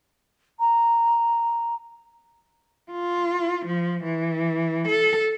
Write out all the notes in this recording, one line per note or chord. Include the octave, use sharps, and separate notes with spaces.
A#5
F4
F3
E3
A4